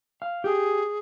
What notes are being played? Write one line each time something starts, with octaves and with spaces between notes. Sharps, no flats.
F5
G4 G#4